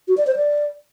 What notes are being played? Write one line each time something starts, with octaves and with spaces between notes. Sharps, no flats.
F#4
D5
C5
D5